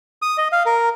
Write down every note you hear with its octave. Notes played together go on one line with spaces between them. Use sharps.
D#6
D#5
F5
A#4